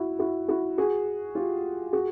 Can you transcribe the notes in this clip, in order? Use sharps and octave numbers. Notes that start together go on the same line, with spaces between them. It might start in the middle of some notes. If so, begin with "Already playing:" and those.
Already playing: E4 F#4
E4 F#4
E4 F#4
F#4 G#4
F4 G4
F#4 G#4